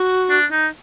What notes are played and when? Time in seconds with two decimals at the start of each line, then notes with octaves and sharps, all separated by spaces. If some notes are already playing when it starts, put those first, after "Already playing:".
Already playing: F#4
0.30 D4
0.52 D#4